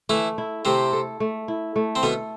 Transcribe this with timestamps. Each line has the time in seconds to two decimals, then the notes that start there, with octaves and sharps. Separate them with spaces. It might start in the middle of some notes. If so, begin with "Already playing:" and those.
0.09 E3 A3 E4
0.38 E4
0.65 C3 A3 C4
0.93 A4
1.20 A3
1.48 E4
1.76 A3
1.96 C4
2.03 B2 B3 A4